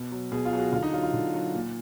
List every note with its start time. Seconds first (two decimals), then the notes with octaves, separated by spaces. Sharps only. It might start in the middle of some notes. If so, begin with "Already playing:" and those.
Already playing: B2
0.12 F#3
0.32 B2 G#4
0.45 F4
0.53 F#3 G#4
0.59 F#4
0.72 D3 F4
0.83 D#4
0.93 F#3 F4
1.03 F4
1.14 D3
1.34 F#3
1.54 A#2